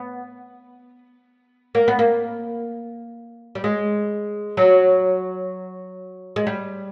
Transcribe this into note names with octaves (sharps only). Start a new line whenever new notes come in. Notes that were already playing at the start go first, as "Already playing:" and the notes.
Already playing: B3
A#3
B3
A#3
G3
G#3
F#3
G#3
G3